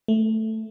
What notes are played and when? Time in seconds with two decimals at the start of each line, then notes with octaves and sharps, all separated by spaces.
0.08 A3